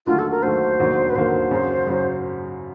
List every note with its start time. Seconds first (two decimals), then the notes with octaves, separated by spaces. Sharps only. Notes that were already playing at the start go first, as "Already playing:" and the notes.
0.06 D#2 D3 F#3 A3 F4
0.19 A4
0.31 A#4
0.43 D#2 D3 F#3 A3 C5
0.79 E1 D#2 D3 F#3 A#3
1.10 B4
1.15 E1 D#2 D3 F#3 A#3 C5
1.51 F#2 C#3 F#3
1.87 F#2 C#3 F#3